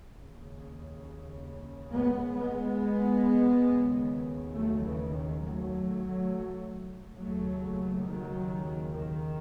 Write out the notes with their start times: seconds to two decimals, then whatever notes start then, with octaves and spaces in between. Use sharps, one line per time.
0.16 D#2 C#3
1.91 G#3 B3
2.35 G#3 B3
3.67 D#2 C#3
4.54 F#3 A3
4.83 C#3 E3
5.13 D#3
5.41 F#3 A3
7.17 D#2 C#3 F#3 A3
8.06 D#3 F#3
8.93 D#3